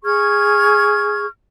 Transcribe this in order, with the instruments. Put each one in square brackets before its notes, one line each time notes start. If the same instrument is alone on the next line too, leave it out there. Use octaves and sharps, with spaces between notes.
[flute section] G#4 C#6 F6 G#6